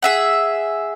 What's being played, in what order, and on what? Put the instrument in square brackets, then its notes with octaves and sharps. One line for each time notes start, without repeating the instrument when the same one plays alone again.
[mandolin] G#4 E5 F#5